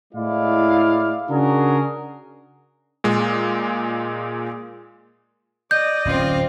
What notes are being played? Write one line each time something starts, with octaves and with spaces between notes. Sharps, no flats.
A2 G#3 E4 D5 F5
C#3 D4 F#4 G#4 A#4
A#2 G#3
D5 D#5 G6
D1 C4 C#4 F4